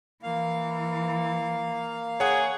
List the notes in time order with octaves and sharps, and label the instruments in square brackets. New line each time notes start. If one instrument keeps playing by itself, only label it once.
[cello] E3 [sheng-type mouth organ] A#3 F5
[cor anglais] G#4 [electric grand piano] C#5 F#5